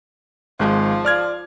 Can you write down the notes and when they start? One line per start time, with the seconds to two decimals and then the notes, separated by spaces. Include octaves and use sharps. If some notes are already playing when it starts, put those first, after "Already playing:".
0.59 G#1 F3 G#3
1.05 D5 F6 G#6